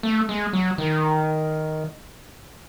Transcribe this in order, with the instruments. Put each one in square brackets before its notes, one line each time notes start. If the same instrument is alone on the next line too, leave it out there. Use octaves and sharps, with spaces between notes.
[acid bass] A3
G#3
F#3
D#3